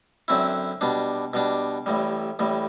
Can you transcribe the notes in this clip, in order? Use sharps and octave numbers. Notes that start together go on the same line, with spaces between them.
F#2 D3 F#3 C4 E4
B2 G3 D4
B2 G3 D4
A1 A2 G3
A1 A2 G3